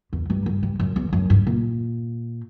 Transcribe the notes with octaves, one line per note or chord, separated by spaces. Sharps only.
E2
G2
G2
G2
F#2
E2
F#2
G2
A#2